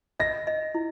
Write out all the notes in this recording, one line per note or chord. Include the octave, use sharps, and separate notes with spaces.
D#5 A#6
D#5
E4